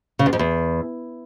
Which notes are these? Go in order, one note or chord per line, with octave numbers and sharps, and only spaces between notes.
C#3
E2
F2
E2